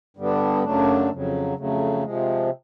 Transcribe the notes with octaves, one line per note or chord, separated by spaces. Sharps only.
G2 D3 G3 B3 D4
F#2 C#3 F#3 A3 D4
F2 C#3 F#3
F2 C#3 F#3 A3
C3 F3 G#3